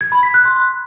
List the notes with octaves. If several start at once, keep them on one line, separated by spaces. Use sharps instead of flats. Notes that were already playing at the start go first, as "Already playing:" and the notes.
G#6
B5
B6
F#6
C6